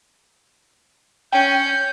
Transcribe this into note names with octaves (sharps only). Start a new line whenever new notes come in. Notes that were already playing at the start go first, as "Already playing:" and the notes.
C#4 G5 G6